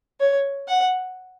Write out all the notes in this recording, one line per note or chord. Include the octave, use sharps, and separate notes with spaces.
C#5
F#5